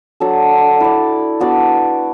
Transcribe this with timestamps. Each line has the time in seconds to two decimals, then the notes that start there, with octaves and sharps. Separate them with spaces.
0.20 F#3 D4 A4
0.81 E4 D5
1.40 B3 D4 F#4 D5